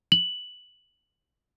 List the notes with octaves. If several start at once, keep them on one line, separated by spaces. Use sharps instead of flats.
F#7